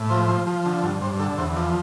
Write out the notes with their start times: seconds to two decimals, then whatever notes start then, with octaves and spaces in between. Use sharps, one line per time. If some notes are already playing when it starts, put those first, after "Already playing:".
Already playing: A2
0.10 F3 C5
0.28 F3
0.47 F3
0.65 D3
0.83 G2
1.01 G2 C5
1.19 D3 A4
1.38 E2 C5
1.56 F3 D5